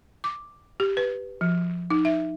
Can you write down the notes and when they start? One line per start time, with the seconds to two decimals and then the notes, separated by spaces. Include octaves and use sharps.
0.24 D6
0.80 G4
0.97 B4
1.41 F3
1.90 D#4
2.05 E5